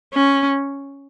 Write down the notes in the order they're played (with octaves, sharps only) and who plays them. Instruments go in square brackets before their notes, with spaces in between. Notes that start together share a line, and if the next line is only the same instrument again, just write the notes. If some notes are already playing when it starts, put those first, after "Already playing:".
[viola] C#4